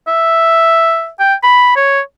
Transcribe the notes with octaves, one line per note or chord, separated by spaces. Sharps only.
E5
G5
B5
C#5